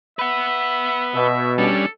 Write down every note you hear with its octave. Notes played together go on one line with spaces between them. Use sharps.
B4 E5 F#5
B2 E5
G3 C#4 D4 A4